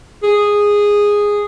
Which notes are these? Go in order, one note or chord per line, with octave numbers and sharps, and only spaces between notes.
G#4